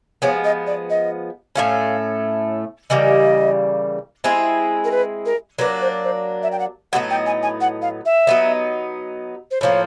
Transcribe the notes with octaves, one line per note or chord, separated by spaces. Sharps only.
F3 G#3 B3 C#5
D#5
D5
D#5
A2 E3 A3 C#4 F5
C#3 E3 G3 A#3 D#5
G#3 C4 E4 G#4
A#4
B4
A#4
F#3 A#3 D4 B4
C5
C5
E5
G5
F#5
A2 F#3 B3 D#4 F#5
G5
G#5
G#5
F#5
F5
E5
F#3 B3 D#4
C5
A2 F3 A#3 C#5